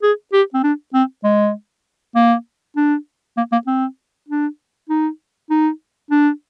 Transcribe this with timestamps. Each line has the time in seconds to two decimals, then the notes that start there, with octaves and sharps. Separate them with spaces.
0.03 G#4
0.33 G4
0.54 C4
0.63 D4
0.94 C4
1.24 G#3
2.16 A#3
2.76 D4
3.37 A#3
3.52 A#3
3.67 C4
4.29 D4
4.89 D#4
5.50 D#4
6.11 D4